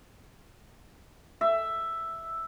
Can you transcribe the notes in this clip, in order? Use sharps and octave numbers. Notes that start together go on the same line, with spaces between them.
E5